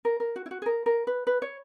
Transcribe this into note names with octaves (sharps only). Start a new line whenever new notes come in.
A#4
A#4
F#4
E4
F#4
G#4
A#4
A#4
B4
B4
C#5